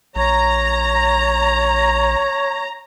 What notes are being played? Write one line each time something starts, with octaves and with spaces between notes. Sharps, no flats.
A#1 C#5 A#5